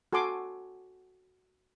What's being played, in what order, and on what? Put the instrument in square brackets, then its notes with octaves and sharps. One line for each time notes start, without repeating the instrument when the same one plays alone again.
[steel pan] F#4 A4 G#5 C6 D6